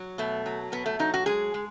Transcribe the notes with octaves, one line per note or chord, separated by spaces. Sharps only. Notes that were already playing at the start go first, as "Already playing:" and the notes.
Already playing: F#3
B2 A3
F#3
B2 B3
A3
F#3 D#4
F#4
G#3 G#4
G#3